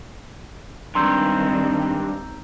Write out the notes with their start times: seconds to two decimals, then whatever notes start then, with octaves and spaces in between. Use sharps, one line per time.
0.95 G2 D#3 G#3 C4 A#5 C6 E6 G6